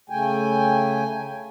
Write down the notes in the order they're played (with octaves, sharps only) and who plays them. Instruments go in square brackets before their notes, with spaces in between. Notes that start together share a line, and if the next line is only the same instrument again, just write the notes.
[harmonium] C#3 A3 G5 G#5